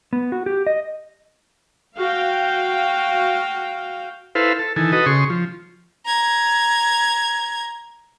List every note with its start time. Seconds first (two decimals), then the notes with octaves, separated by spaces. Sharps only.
0.13 B3
0.32 F#4
0.46 G4
0.67 D#5
1.97 F#4 F5 G5
4.35 E4 A4 B4 C5 F5
4.59 A4
4.76 D#3 E3 A4 G#5
4.92 F#4 A4 B4 D#5
5.06 C#3 G#4 C6 C#6
5.30 F3
6.06 A#5 G#6